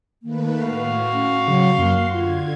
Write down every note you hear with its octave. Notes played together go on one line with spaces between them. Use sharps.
D#3 A3 A#3 B4
A2 F#4 F5
C#4
C#3 F#3 C6
F#2 A#3
D3 F4 G#6